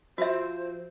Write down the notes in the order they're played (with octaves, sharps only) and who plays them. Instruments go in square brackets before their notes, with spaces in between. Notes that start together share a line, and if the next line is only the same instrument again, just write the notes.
[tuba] F3 [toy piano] F#4 E5 [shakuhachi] C5